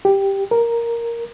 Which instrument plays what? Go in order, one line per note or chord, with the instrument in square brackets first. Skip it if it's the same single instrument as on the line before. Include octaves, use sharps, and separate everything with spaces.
[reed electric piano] G4
A#4